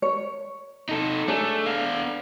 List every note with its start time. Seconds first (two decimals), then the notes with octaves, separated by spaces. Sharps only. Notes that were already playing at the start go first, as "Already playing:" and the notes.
0.02 C#5
0.89 D#4 A4
1.28 A3 D4 G#4 C#5
1.66 B3 F5